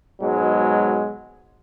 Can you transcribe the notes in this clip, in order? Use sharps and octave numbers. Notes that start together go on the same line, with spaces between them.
G#2 B2 F#3 G#3